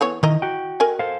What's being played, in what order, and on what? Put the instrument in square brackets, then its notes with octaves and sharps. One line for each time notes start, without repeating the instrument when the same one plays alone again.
[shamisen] E3 B3 C#5
[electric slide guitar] D#3 [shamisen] E4 D#5 A#5
[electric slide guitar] F#4 G5
[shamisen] A#4 D#5 G#5
[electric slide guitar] A4 C5 F5